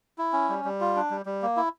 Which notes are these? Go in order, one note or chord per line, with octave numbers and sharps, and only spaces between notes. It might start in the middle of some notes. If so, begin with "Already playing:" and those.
E4
C#4
G3
G3
F4
D4
G3
G3
A#3
E4